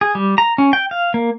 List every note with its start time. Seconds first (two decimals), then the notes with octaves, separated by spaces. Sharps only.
0.01 G#4
0.15 G3
0.38 A#5
0.58 C#4
0.73 G5
0.91 F5
1.14 A#3